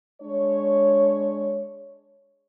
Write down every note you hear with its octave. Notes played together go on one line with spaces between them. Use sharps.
G#3 D4 C#5